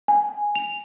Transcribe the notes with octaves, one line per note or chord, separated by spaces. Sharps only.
G#5
F7